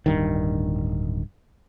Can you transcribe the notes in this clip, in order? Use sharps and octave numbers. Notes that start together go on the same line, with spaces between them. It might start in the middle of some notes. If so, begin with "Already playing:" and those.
D1 G2 D#3